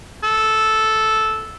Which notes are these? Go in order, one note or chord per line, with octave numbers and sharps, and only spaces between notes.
A4